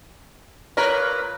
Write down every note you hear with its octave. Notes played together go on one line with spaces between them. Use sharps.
A#2 A#4 B4 C#5